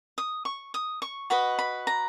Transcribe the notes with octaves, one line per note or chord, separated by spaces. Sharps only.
D#6
C#6
D#6
C#6
F#4 B4 D#5 B5
B5
A#5